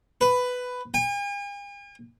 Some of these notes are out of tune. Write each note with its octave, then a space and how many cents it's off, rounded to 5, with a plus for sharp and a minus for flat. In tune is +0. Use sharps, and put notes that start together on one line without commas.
B4 +10
G#5 -45